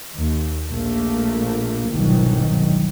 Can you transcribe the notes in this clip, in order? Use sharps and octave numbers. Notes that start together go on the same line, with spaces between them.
D#2
A#1 A3 A#3
G1 C2 G#2 B2 D#3 F#3